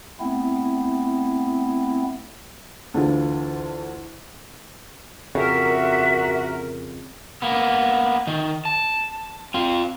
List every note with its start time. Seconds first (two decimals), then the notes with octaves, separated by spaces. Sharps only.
0.20 A3 B3 C4 E4
2.94 D2 D3 E3 F4
5.35 F2 C#3 F#4 A#4 E5
7.42 A#3 B3
8.27 D#3
8.65 A5
9.54 C4 F4